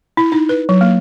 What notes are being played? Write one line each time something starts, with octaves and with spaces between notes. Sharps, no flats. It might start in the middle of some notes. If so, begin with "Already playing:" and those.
E4
D#4
B4
F#3
A#3